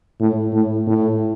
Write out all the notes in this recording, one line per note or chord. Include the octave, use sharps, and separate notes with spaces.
A2
A2
A2